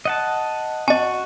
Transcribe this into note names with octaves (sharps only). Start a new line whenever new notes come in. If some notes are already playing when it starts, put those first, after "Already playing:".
D#5 F#5 A5
F#4 D#5 A5